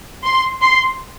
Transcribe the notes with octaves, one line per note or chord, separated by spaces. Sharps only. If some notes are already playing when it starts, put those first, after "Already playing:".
C6
C6